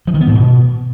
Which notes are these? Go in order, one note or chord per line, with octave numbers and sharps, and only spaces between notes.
F3
D#3
B3
G#2
B2